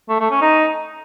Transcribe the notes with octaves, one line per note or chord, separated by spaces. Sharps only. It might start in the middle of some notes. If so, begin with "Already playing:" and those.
A3
A3
C#4
D#4